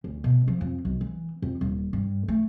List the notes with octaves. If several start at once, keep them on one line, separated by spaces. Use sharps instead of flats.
D2
B2
F3
F2
B1
E3
F2
D#1
G2
A3